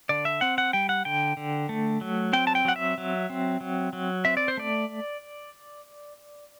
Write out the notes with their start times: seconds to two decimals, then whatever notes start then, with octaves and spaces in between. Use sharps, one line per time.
0.09 D3 D5
0.25 E5
0.41 C4 F#5
0.58 F#5
0.73 G3 G5
0.89 F#5
1.05 D3 G5
1.37 D3
1.69 A3
2.01 F#3
2.33 C4 G5
2.47 A5
2.55 G5
2.65 F#3 F#5
2.76 E5
2.98 F#3
3.30 C4
3.61 F#3
3.93 F#3
4.25 C4 E5
4.37 D5
4.48 C5
4.57 A3 D5